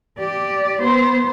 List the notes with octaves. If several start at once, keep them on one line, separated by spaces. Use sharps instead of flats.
G4 D5
B3 C5